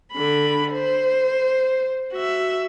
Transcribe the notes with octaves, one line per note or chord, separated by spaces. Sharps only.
D3 B5
C5
F#4 E5